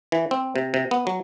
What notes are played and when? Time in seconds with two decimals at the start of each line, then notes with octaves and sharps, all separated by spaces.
0.12 E3
0.31 C4
0.56 C3
0.74 C3
0.91 B3
1.07 F#3